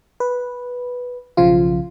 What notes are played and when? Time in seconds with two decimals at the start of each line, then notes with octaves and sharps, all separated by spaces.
0.20 B4
1.37 B1 C#3 F3 F4